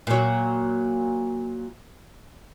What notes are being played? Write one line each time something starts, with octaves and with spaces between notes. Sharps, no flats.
A#2 F#3